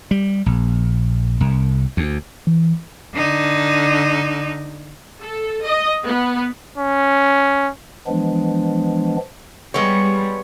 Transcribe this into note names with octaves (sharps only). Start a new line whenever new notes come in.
G3
A#1
C2
D2
E3
D3 D#4
A4
D#5
B3
C#4
E3 F3 G#3 B3 D4
G3 G#3 B3 C#5